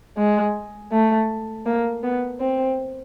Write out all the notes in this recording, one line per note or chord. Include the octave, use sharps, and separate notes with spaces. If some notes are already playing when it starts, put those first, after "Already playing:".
G#3
A3
A#3
B3
C4